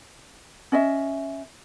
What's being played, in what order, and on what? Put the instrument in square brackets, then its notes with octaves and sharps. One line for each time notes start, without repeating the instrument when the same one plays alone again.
[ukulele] C#4 D#5 E5